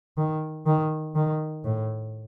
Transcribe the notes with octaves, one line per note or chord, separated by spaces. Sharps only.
D#3
D#3
D#3
A2